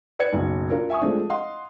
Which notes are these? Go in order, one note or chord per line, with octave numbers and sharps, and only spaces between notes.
B4 D5 G#6 C#7
F#1 B1
D4 F4 A#4
E5 G#5 C#6 D#6
F3 G#3 A3 C4 D4
D#5 F5 F#5 C6